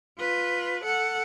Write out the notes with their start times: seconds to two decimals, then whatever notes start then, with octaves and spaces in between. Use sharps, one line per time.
0.19 F4 B4
0.84 A4 F#5